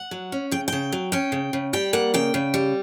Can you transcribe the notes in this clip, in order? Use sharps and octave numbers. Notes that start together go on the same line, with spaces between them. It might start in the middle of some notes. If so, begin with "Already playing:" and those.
Already playing: F#5
F#3
C#4
C#3 G5
C#3 G5
F#3
C#4 G5
C#3
C#3
G3 G5
A#3 F#5
C#3 G5
C#3
G3